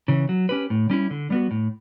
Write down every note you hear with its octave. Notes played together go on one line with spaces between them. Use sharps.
C#3 E3
F#3
C#4 G4 B4
A2
G3 C#4 E4
D3
G3 B3 F#4
A2